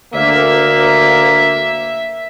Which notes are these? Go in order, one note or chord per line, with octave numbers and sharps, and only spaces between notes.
D2 A#3 E5